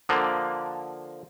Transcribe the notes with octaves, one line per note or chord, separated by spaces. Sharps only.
D3 F3 A#3